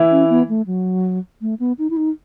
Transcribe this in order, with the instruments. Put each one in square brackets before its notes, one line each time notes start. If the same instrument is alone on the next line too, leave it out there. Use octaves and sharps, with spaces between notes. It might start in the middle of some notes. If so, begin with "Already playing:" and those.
Already playing: [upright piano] E3 E4
[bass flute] C#4
B3
A3
F#3
A3
B3
D#4
E4
D#4